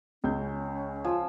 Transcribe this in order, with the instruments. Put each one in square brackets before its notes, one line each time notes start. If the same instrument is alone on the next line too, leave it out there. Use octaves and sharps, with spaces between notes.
[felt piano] C#2 C#5 G6 [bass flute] C#4
[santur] F3 E6 [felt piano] G#5